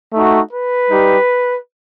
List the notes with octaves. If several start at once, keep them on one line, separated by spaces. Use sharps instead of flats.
A3 D#4 F#4
B4
G3 D#4 G4